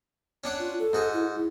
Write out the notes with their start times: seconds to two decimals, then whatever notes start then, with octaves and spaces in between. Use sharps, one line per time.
0.44 C#4 D4 F#5
0.59 F4
0.79 A4
0.93 G#2 F#4 G#5
1.13 E4
1.35 E4